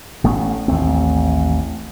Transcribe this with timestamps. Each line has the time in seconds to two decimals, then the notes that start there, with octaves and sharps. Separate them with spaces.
0.24 A1 A3 B3 C#4
0.68 A1 D#2 A3 C4